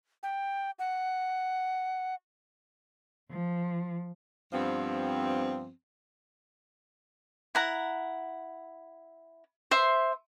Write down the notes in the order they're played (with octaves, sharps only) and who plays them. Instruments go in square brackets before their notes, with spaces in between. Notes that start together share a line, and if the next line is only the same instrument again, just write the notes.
[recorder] G5
F#5
[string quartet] F3
[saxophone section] G2 F3 B3 C4
[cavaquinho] E4 F#5 A#5
C5 E5 C6